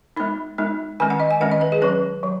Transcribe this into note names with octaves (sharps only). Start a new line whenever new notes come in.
G#3 B3 D#4 B5
G#3 B3 D#4
D#3 G#3 C#4 G#5
F#5
D#5
G#5
D#3 G#3 C#4 F#5
D#5
B4
G#4
F#3 C#4 B4
F#3